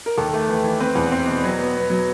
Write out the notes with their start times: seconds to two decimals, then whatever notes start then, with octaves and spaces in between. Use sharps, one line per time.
0.06 A#4
0.18 D#2 A4
0.33 A3
0.48 E3
0.64 E3
0.80 C4 B4
0.95 E2
1.12 C4
1.27 B2
1.44 F#3 B4
1.59 B3
1.75 B3
1.90 F#3